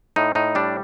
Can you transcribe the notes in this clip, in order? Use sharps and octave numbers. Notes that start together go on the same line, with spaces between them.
A2 D#4
A2 D#4
G3 D4